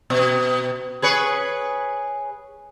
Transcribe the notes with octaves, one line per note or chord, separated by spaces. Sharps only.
B2
G#4 B4 C#5